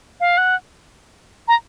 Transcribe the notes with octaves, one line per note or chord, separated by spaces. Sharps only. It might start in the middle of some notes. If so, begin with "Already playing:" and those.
F5
F#5
A#5